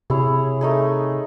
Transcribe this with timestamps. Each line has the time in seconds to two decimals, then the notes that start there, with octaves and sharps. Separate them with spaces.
0.10 C3 E4 G#4 C#5
0.61 A3 D#4 G#4